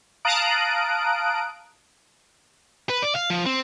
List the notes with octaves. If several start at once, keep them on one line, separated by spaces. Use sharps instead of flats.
F5 A5 A#5 D#6 F#6 D7
B4
D5
F5
F3
C4